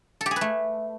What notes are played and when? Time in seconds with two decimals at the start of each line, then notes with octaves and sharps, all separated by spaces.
0.21 A4
0.26 G4
0.31 G#4
0.36 B4
0.41 A3